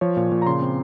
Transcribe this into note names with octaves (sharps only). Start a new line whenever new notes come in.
F3 C#5
A#2
A#2
A#5
C#3 C6
C4